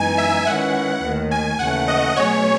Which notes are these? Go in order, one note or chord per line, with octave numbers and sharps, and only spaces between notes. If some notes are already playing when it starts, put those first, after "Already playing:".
Already playing: F#2 E3 G#3 B3 D#4 G#5
E5
D#3 G#3 C#4 E4 B4 F#5
D#2 D#3 A3
G#5
D#2 C#3 E3 A3 F#5
D#5
B2 F#3 A3 C#4 G#4 C#5